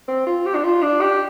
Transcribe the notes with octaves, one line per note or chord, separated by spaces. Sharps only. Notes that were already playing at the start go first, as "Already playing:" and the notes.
C4
F4
G4
D4
F4
D4
G4